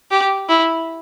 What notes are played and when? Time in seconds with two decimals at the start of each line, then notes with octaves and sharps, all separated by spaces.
0.11 G4
0.49 E4